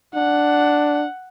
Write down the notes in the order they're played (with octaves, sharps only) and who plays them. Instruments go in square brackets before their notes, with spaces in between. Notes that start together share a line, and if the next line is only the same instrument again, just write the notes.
[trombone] D4 [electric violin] F#5